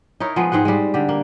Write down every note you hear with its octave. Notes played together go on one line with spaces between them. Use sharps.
D#4 E4 A#4 C#5
F3 G#3 B3
G#2 C4 G#4 F#5
G3 G#3
D3 G4
A#3